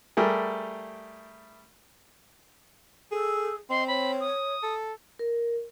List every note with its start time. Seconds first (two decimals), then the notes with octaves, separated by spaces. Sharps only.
0.17 G3 A3 G4 G#4 A#4
3.12 G#4 A4
3.70 C4 D#5 C6
3.88 C#5 B5
4.20 D#6
4.63 A4
5.19 A#4